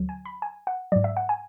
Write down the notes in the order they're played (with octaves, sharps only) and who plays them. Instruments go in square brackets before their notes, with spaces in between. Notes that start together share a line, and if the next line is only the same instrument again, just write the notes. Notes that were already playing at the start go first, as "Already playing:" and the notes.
Already playing: [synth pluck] D2 D3 F#3
G#5
B5
G#5
F#5
G#2 F#3 D5
E5
F#5
G#5